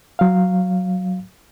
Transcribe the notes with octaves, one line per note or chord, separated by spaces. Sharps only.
F#3 F5